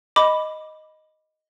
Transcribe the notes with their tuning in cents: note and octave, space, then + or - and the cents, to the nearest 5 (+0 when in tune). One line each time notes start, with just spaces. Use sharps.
D#5 +0 B5 +0 D6 +0